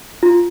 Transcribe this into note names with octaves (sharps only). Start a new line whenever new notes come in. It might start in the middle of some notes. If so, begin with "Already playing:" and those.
F4